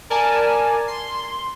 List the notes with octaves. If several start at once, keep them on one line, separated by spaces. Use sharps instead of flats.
A#4 D5 G#5 A5
C6